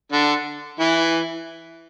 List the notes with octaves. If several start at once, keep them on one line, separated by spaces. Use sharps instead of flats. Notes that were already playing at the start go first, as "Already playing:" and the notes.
D3 D4
E3 E4